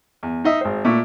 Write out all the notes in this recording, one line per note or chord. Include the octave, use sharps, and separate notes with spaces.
E2
D#4 D#5 E5
G#1 C5
A#2 A3 E5 C#6